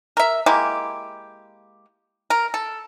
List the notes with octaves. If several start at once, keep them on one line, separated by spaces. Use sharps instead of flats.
A#4 E5
G#3 A#3 E4 G4
A#4
A4